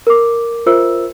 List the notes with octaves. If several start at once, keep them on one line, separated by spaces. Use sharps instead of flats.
A#4 D6
F4 A#4 C5 E5 E6